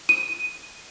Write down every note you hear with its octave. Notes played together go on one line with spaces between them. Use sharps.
D#7